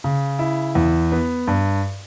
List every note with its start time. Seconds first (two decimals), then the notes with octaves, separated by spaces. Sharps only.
0.04 C#3
0.39 E4
0.75 E2
1.12 B3
1.47 G2